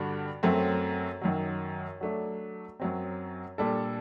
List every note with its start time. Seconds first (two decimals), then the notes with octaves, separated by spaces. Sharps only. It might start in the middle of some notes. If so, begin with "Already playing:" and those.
Already playing: G2 D3 G3 D4 F#4
0.43 F#2 F#3 A3 C4
1.22 F#2 D#3 F#3
2.01 F#3 A3 D4
2.80 F#2 F#3 C4
3.58 A#2 G3 D4 A4